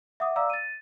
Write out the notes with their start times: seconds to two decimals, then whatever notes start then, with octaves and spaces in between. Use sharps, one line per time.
0.20 E5 F#5 D6 D#6
0.36 D5 F5 A#5 D6 E6
0.50 A6 D#7